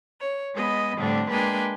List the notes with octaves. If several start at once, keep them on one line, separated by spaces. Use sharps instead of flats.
C#5
G#3 B3 D#5 B5
A2 D3 G3 C4 D4
G#3 A#3 D4 B4 G5 G#5